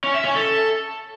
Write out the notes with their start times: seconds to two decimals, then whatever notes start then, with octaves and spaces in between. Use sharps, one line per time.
0.04 C#4
0.14 E5
0.25 C#4
0.35 A4